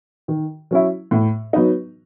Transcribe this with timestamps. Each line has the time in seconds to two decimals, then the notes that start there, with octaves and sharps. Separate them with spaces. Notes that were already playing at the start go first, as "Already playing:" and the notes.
0.28 D#3
0.71 F#3 C#4 E4
1.11 A2
1.53 F#3 B3 D#4